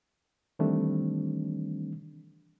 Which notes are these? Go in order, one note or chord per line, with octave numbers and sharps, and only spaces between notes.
D#3 E3 G3 A3 C4 D4